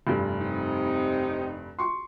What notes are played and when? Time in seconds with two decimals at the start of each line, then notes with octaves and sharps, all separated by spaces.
0.07 F1 G2
0.41 C3 D#4
1.79 C6 C#6